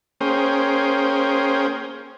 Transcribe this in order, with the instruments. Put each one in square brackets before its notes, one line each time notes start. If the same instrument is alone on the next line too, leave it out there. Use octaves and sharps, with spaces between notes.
[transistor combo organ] A#3 C#4 G#4 C5 G5